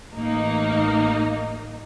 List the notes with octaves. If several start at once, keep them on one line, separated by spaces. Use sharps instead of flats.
A1 A#3 D#4